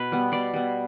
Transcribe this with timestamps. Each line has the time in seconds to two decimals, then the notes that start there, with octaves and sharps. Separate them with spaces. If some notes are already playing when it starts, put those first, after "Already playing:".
Already playing: B2 B4
0.12 G3 B3
0.32 B2 D5
0.54 G3 B3